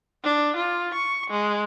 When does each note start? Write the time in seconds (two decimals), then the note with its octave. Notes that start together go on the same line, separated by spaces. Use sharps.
0.24 D4
0.56 F4
0.94 C#6
1.30 G#3